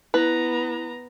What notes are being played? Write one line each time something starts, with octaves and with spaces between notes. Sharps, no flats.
B3 E4 B4 A#5